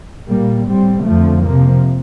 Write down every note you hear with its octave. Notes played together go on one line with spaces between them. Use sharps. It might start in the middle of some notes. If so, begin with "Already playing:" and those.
A#2 G3 A#3
A2 G3 C4
F2 D3 F3 A3
C3 F3 A#3